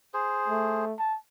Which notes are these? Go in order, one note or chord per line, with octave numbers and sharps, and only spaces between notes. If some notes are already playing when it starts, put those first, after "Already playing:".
G#4 C5
A3
A5